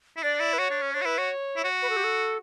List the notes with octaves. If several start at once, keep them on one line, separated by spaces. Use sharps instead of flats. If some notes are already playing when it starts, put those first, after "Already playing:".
E4
D4 D5
E4
B4
F#4 C#5
D4
C#4
D4 C#5
F#4
E4 B4
F#4 C#5
E4
F#4
B4
A4
G4
A4